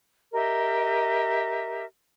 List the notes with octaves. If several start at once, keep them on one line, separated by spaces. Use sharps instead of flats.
G4 A#4 D#5 E5